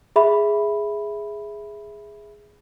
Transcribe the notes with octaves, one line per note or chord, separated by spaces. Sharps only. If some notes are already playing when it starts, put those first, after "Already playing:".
G#4 E5 B5